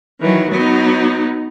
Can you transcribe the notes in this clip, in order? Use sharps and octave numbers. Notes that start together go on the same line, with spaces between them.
D#3 E3 F#3
F#3 B3 D#4